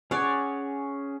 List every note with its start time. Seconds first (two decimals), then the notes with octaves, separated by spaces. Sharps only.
0.11 C#4 G#4 C#5 D5 F#5